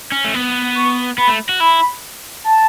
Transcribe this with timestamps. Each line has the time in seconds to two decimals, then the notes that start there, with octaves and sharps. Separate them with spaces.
0.12 C#4
0.25 A3
0.34 B3
0.75 C#6
1.17 B3 B5
1.28 A3
1.49 F#4
1.59 E4 B5
2.44 A5